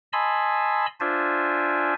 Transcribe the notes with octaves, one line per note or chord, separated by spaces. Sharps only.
D#5 G#5 A5 B5 C6 E6
D4 F4 C5 D5 E5 G#5